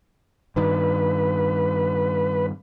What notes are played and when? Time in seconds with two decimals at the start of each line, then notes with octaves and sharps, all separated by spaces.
0.56 G2 D#3 B4